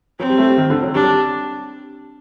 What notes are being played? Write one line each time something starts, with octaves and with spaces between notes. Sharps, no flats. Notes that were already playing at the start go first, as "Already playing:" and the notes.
F#3 C4
G3
A3
G3
D#3
D3
F#3
G3 D4